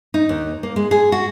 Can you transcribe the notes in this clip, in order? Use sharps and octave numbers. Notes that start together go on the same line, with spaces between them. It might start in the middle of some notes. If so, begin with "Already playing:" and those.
D#4
D#2
A#3
G#3
G#4
F#4